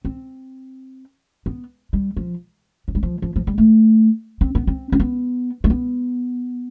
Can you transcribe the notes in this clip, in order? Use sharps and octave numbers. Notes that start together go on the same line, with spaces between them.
C4
B3
G3
F3
F3
G3
F3
F3
F3
G3
A3
C4
B3
C4
C4
B3
A3
B3